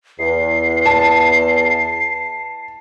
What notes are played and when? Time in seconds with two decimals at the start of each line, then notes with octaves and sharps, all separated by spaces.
0.19 E2 C7
0.86 A5